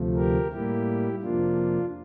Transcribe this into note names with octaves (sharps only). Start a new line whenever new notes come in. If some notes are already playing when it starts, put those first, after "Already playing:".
Already playing: D2 C3 F3 A3
G4 A#4
A2 G3 A#3 E4 G4
F2 C3 F3 A#3 D4 F4